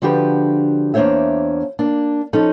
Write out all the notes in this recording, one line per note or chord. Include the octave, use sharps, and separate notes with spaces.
D3 F3 D4 F#4 G4 B4
E2 A#3 D4 C5 C#5 E5
A#3 D4
F3 C#4 D#4 A4